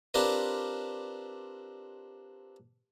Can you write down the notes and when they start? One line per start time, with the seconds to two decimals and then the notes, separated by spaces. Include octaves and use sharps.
0.14 C4 D4 F4 G4 A#4 B4